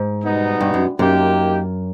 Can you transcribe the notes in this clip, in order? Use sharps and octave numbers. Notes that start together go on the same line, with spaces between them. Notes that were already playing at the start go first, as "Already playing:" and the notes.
Already playing: G#2
B2 G3 B3 D#4
G2
F#2
F#2 A#3 D#4 G4